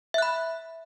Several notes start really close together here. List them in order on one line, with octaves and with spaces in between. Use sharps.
E5 F#6 B5